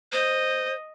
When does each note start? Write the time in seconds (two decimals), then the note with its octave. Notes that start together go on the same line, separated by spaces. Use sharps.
0.12 C5 D#5